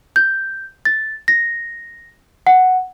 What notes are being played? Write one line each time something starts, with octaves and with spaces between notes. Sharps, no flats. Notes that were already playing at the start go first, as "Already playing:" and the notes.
G6
A6
A#6
F#5